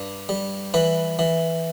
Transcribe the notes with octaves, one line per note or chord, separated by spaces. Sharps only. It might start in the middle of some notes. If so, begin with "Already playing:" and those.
Already playing: G2
G3
E3 B4
E3